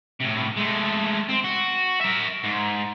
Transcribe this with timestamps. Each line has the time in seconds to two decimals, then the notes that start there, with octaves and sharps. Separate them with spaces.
0.21 A2 C3
0.57 G#3 A3
1.29 C4
1.44 F#4
2.01 A#4 E5
2.44 G#2